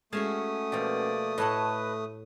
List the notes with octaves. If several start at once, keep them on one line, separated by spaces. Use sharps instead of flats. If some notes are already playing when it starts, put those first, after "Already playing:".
G#3 A3 C#4 F#4 F5 G#5 A5 D#6
B2 F3 A#3 G4 D5
A2 B4 C#5 D#5 F#5 A5